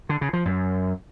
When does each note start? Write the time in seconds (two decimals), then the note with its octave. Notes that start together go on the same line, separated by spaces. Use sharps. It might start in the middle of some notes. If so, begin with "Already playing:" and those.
0.09 D3
0.21 C#3
0.33 F3
0.45 F#2